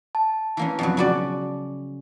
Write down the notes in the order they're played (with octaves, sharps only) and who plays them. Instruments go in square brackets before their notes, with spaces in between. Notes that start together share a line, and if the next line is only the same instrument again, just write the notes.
[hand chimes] A5
[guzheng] E3 A#3 C#4
F2 B2 F#3
C#3 F#4 D5